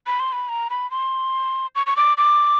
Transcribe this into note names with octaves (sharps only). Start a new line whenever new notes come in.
B5
C6
B5
A#5
B5
C6
C#6
C#6
D6
D6